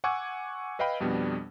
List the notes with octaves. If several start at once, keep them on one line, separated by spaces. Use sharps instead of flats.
F#5 G#5 C#6 D6 E6 G#6
B4 D#5 F5 G5 B5
F2 B2 G3 B3 D4